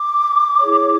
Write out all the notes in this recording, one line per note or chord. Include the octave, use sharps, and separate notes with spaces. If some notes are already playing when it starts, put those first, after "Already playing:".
Already playing: D6
E4 G#4 C#5